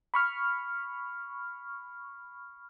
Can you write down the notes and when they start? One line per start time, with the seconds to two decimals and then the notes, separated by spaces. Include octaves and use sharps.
0.14 B5 C#6 F6